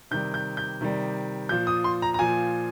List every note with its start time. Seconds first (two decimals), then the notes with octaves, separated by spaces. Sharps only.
0.11 C3 D#3 G3 G6
0.34 G6
0.57 G6
0.81 C3 D#3 G3
1.49 A#2 F3 G6
1.67 D#6
1.84 C6
2.02 A#5
2.14 A#5
2.19 A#2 F3 G#5